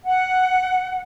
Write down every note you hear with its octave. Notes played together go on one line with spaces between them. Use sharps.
F#5